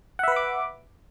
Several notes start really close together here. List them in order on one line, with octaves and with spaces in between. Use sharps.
F#5 E5 B4 B5 D6